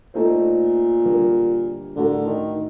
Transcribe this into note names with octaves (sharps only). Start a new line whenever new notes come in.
A#2 A3 D#4 A4 C5
D3 G3 A#3
A2 D3 A3 D4 F#4 A#4
D#3